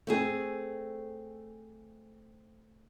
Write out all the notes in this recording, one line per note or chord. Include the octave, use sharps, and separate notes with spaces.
A3 C4 G#4